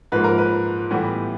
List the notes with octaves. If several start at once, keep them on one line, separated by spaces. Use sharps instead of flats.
G#2 F3 A#3 B4
A#4
B4
A2 E3 G3 B3